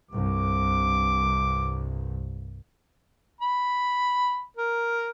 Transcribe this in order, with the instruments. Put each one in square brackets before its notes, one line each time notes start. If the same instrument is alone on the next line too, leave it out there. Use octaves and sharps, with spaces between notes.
[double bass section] C2 G2 [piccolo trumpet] D6
[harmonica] B5
A#4